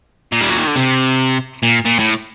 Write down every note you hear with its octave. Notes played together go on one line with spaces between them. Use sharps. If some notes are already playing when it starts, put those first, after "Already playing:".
A#2
G3
F#3
D#3
D3
C3
A#2
A#2
A2